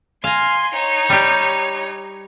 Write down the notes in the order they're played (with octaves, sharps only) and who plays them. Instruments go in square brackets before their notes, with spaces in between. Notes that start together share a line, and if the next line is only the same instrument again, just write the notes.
[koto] F5 A#5 [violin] G#5 C6
[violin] D#4 C#5
[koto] G3 G4